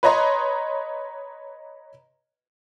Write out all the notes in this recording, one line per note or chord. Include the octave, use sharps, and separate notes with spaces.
B4 C#5 D#5 A#5 C6